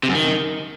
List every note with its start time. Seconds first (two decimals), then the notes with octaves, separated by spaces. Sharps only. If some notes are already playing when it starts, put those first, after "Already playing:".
0.03 C3
0.09 F#2
0.14 D#3